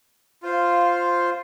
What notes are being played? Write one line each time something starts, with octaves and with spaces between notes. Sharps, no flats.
F4 C5 F5